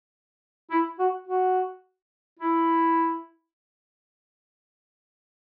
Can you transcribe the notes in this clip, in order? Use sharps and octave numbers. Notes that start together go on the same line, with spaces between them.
E4
F#4
F#4
E4